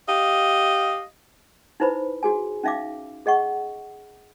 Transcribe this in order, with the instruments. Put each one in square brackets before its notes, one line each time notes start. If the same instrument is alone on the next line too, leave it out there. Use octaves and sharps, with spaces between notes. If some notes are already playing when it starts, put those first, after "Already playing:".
[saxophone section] G4 D#5 F5
[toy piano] D#4 E4 B4 C5 B5
F#4 G#4 G#5
C#4 D#4 E5 F5 D6
G#4 D#5 F#5 C#6